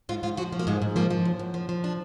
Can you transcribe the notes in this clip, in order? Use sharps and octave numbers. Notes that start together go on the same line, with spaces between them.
G#2 F4
G#2 F4
F3 F#4
F3
A#3
G#2 G#3
G#2
F3 A#3
F3
F#2
F#2
F3
F3
D4